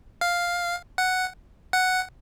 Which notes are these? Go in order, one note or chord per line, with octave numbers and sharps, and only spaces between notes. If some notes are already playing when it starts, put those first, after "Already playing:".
F5
F#5
F#5